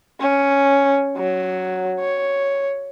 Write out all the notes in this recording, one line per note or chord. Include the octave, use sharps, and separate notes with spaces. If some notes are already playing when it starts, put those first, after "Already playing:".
C#4
F#3
C#5